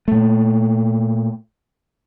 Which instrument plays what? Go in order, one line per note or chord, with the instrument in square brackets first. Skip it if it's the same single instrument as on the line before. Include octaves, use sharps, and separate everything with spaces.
[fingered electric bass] A#2 A3